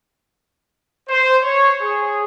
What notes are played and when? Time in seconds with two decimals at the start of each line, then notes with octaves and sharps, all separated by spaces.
1.09 C5
1.43 C#5
1.82 G#4